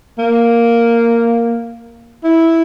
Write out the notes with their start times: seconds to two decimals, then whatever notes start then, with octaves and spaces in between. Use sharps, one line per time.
0.18 A#3
2.24 E4